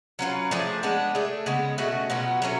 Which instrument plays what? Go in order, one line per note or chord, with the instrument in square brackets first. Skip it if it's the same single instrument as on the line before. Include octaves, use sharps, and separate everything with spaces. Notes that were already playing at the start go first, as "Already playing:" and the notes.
[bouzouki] F#3 C#4 F4 B4
F3 A3 D4 G#4
G#3 B3 D4
A3 D4 G#4
C#3 G#3 B3
B2 A3 C#4 F#4
B2 F#3 B3 F4
F#3 A3 C#4